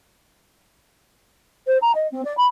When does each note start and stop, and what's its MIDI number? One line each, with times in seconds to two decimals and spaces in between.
1.67 1.77 72
1.81 1.92 82
1.95 2.07 75
2.11 2.23 60
2.24 2.35 74
2.37 2.46 83